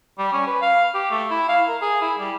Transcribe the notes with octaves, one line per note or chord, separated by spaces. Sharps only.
G3
C#4
B4
F5
G4
A3
E4
F5
A#4
G#4
E4
G3